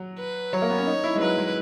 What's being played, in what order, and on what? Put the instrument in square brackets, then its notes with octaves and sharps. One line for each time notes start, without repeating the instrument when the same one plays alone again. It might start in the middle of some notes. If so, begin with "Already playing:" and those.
Already playing: [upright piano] F#3
[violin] B4
[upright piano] F#3 [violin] C#5
[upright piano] A#3
B3
C#4
D#4
E4
G#3
[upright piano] F#3 [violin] B4
[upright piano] G#3